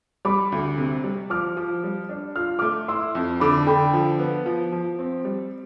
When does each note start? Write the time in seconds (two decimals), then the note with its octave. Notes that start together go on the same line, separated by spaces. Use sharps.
0.25 G3 B5 D6
0.52 D2
0.78 C3
1.04 G3
1.30 F3 D6 F6
1.57 F3
1.84 G3
2.09 D4
2.36 F4 F6
2.59 A3 D6 F6
2.88 E4 C6 E6
3.15 F2
3.40 D3 B5 D6
3.57 A5
3.67 D3 G5 B5
3.94 F3
4.19 B3
4.46 F3
4.72 F3
4.99 C4
5.25 G3